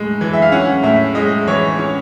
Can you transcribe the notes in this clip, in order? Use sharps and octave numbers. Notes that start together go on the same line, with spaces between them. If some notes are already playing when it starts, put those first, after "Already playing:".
Already playing: A2 G#3
E3
E5
F5
C#4 F#5
A2 E5
G#3 D#5
E3 C#5
C#4